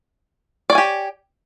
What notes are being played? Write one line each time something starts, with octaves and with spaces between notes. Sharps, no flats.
G4 C#5 D5 G#5